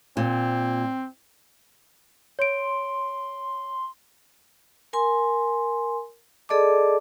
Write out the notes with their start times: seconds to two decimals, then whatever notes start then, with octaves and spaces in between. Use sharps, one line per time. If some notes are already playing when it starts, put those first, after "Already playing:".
0.17 A#2 C4
2.39 C#5 C6 D7
4.93 A#4 G#5 C6
6.49 G#4 A4 D5 D#5 A5 D6